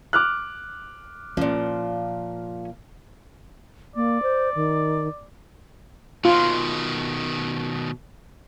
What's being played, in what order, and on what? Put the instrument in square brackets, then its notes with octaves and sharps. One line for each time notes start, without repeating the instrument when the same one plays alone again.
[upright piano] D6 F6 F#6
[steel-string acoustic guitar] A#2 F3 [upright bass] C#4
[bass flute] A#3 [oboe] D5
[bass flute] C5
D#3
[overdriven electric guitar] B2 D#3 [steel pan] F4